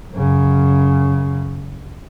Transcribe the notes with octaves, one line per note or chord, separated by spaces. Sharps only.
F#2 C#3